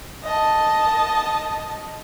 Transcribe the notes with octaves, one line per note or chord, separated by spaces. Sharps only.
D#5 A5